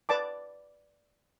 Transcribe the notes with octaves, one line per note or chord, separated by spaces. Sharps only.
B4 D5 A5 D6